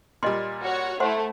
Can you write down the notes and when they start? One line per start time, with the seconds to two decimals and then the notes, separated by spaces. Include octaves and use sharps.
0.23 A#2 G3 D#5 C6
0.63 F#4 C#5
1.00 A3 E4 C5 F#5 C6